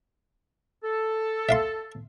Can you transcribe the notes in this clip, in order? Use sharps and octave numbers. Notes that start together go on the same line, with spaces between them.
A4
E5 F5 C6